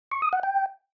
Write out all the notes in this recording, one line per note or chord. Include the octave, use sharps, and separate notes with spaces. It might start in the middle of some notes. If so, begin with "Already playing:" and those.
C#6
D#6
F#5
G5